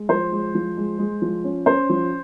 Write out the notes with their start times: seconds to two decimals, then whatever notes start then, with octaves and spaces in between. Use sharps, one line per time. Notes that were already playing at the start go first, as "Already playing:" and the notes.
Already playing: G#3
0.09 F3 C5
0.32 G#3
0.55 F3
0.77 G#3
0.99 G#3
1.22 F3
1.44 C#4
1.66 C#4 C5
1.89 F3